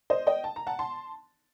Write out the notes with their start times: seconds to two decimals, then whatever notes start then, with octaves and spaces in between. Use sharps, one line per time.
0.10 C5 D#5
0.27 D#5 G5
0.44 A5
0.56 A#5
0.67 F#5 A5
0.79 A5 C6